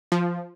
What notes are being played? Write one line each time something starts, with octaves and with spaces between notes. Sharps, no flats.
F3